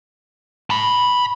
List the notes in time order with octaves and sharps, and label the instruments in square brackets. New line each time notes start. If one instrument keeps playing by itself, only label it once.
[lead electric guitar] A5 B5